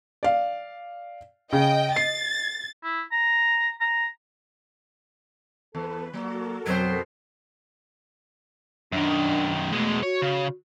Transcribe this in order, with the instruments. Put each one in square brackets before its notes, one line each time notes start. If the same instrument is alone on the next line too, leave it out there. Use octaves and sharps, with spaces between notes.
[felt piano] D5 F5
[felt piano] C#3 [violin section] D#5 G5
[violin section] A6 [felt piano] C7
[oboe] E4
A#5
A#5
[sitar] E2 [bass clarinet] A4 [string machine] B4
[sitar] F#3 [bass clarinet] A#3 [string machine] F#4 A4 A#4
[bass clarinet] F2 [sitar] B2 C5 [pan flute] F#3
[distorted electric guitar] F#2 D#3 [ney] D4
[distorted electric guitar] B2 G#3 [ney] A3
[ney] F#4 [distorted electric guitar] C#5
[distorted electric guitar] C#3